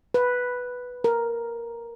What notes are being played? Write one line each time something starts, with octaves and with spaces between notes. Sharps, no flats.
B4
A#4